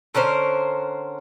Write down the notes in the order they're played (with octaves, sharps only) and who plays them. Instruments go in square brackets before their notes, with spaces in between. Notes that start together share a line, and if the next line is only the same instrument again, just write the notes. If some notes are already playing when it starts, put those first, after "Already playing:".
[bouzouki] D3 C#4 A#4 C5